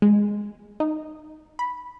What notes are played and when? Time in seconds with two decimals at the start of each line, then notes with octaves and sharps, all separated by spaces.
0.02 G#3
0.80 D#4
1.59 B5